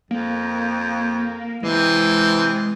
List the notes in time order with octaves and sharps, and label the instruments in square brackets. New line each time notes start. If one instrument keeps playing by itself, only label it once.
[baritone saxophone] F2 [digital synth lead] A#3
[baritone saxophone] C3 [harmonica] E3 [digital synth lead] G#3